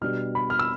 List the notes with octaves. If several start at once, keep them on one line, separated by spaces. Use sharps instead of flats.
B2 G3 D4 F6
B5
F6
E6